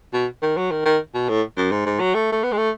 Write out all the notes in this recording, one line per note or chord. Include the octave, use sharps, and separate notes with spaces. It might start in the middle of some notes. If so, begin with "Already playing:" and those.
B2
D#3
F#3
D#3
D#3
B2
A2
F#2
G#2
G#2
F#3
A3
A3
B3
G#3
A3